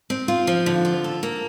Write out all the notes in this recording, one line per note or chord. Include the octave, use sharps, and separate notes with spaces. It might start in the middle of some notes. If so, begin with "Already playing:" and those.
C4
F4
F3
D3
F4
A4
A#3